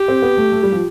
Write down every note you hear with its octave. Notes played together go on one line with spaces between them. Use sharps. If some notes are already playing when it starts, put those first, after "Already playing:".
Already playing: G4
C4
B3
A3
A3
G3
F3